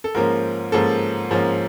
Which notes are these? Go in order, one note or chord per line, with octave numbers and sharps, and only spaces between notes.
A4
G#2 F3 A#3 C#4 A#4
G#2 F3 A#3 C#4 A4
G#2 F3 A#3 C#4